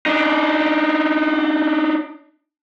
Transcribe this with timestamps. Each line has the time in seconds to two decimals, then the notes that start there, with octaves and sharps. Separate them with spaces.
0.06 D4 D#4